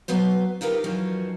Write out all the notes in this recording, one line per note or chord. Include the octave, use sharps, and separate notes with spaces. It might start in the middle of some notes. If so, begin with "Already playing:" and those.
F#3 B3 B4 C5
D#4 F4 G4 A#4 B4
F#2 E3 F3 C#4 D#4